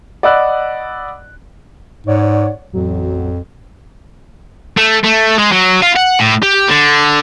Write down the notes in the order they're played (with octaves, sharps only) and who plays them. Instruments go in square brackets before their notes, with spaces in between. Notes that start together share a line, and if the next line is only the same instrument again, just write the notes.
[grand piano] D5 D#5 F#5 B5 E6 F#6
[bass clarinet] G#2 [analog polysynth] C#5 D5 F#5
[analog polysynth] A1 F#3 [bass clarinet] F2
[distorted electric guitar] A3
A3
G#3
F#3
F4
F#5
A2
G4
D3